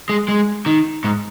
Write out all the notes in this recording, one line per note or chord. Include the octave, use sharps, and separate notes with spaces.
G#3
G#3
D#3
G#2